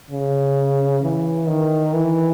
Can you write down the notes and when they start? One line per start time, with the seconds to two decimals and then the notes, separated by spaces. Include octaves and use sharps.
0.11 C#3
1.02 E3
1.48 D#3
1.93 E3